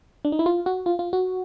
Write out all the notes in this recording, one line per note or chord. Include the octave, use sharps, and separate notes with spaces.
D4
D#4
E4
F4
F#4
F4
F4
F#4